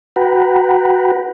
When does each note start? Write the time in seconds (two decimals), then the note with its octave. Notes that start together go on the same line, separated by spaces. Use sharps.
0.16 F#4 B4 F#5 G5 A#5 B5